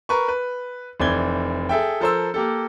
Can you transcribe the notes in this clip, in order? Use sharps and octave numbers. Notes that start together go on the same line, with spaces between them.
A#4 B4 C#6
B4
F1 E3 C4 D5 G#6 G7
G#4 A4 E5 G5
F3 A4 A#4 C5 C6 E6
A#3 G4 A4